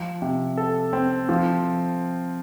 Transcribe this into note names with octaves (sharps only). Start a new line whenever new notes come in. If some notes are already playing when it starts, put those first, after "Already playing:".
Already playing: F3
C3
A4
C4
F3